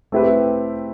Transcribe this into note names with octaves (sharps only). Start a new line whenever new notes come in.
A3 C4 E4 G4 B4